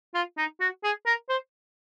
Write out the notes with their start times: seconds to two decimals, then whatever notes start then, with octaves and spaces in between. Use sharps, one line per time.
0.14 F4
0.38 D#4
0.60 F#4
0.84 G#4
1.06 A#4
1.29 C5